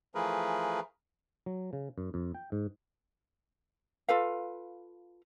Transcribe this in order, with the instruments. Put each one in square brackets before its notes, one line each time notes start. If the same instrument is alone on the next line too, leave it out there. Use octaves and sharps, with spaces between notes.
[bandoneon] E3 F3 A3 G#4 A#4 B4
[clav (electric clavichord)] F#3
C#3
F#2
F2
G5
G#2
[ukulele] F4 A4 B4 F5